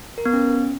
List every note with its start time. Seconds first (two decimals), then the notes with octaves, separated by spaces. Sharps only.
0.18 A#4
0.25 B3
0.33 C#4